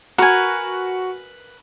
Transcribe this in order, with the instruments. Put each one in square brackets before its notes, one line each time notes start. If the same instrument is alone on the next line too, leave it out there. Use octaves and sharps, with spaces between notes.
[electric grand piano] F#4 F#5 [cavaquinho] A#4 B4 G#5